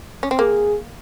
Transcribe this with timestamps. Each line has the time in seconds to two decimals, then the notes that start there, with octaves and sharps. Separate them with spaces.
0.23 C#4
0.31 C4
0.39 A#3 G#4